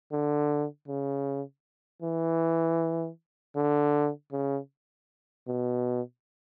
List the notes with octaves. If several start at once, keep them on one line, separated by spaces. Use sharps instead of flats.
D3
C#3
E3
D3
C#3
B2